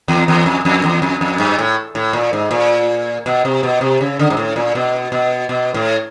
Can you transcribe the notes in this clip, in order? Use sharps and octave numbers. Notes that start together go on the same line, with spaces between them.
E2
E2
F2
F2
E2
F2
F2
G2
A2
A2
A#2
G#2
A#2
B2
C3
B2
C3
C#3
D3
G#2
A2
A#2
B2
B2
B2
A2